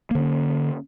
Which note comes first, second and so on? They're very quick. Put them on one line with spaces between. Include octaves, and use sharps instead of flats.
A#3 D3 C#4